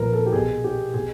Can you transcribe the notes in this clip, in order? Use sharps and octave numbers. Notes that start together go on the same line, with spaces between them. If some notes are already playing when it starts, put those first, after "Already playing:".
Already playing: A#2 F3 A#4 B4
A4
G4
B2 G#4
G4
B2 G#4